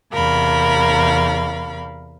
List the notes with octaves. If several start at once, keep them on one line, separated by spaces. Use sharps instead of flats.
E2 C3 A#4 F5 B5